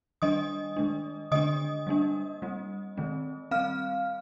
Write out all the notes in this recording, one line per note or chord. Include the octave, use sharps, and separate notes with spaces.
D#3 G3 D4 D#5 D#6
D#3 G#3 D4
D3 G#3 D4 D#5 D#6
G3 A#3 D4
G3 C4
D#3 G#3 C4
G3 C4 F5 F6